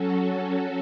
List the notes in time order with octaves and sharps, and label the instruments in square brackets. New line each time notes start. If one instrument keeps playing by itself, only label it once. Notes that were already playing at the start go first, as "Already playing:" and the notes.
Already playing: [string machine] F#3 C#4 F#4 A4